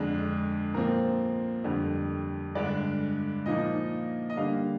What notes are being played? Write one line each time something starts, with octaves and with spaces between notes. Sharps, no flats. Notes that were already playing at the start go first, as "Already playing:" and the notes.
Already playing: F2 D3 G#3 D4
A#2 F3 C4 A#4
F2 D3 G3
G2 D3 G#3 D4 D5
A#2 F3 A#3 D#4 D#5
D#5
D3 G3 A#3 F5